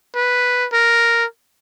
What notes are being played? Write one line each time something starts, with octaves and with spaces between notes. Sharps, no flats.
B4
A#4